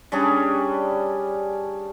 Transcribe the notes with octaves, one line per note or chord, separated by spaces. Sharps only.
G3 C#4 D4 G#4